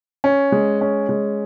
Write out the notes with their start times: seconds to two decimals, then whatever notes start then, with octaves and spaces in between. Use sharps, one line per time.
0.24 C#4
0.52 G#3
0.81 C#4
1.09 G#3